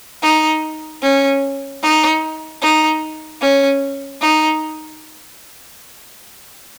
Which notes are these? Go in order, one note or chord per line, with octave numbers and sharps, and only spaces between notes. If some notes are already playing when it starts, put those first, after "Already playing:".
D#4
C#4
D#4
D#4
C#4
D#4